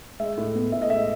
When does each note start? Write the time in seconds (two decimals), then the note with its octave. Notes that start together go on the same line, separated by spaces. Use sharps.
0.20 G#3 E5
0.37 A2
0.55 B3
0.72 A2 E5
0.82 D#5
0.90 G#3 E5